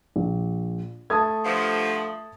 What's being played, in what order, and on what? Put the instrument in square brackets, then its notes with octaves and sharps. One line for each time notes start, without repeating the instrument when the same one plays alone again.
[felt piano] A#1
[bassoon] A3 [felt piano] A5 D#6 G#6
[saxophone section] G2 D3 F3